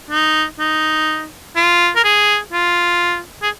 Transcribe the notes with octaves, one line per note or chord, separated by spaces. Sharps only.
D#4
D#4
F4
A#4
G#4
F4
G#4